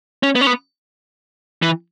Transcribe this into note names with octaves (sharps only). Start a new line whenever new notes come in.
C#4
B3
C#4
B3
E3